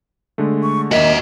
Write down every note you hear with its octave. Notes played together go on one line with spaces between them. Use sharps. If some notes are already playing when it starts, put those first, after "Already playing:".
D3 G#3 A3
C#6
D#2 A#3 F#4 D#5 E5